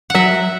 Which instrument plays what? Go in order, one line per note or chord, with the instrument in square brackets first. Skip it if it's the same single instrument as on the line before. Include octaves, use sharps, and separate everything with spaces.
[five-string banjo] F#3 [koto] E5 F#5